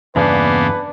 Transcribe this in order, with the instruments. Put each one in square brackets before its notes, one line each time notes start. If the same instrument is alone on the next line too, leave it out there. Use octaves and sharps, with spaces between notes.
[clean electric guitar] E2 G2 C#3 [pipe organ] A#3 B3 [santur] D4 [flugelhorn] B4